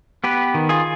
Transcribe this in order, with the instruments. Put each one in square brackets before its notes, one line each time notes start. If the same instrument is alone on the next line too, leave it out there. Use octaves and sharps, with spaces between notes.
[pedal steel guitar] B3 G4 B4
D#3
F4 G#4